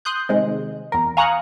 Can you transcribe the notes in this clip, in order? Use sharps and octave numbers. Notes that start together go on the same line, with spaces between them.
C6 D#6 F#6 G6
C3 D#3 G#3
E2 A#4
F5 G#5 A#5 C#6 D#6 F#6